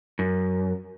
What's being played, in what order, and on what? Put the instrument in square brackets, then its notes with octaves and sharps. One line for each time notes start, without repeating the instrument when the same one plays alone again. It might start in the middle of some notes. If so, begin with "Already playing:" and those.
[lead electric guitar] F#2